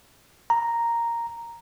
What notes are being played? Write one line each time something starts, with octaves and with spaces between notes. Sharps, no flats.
A#5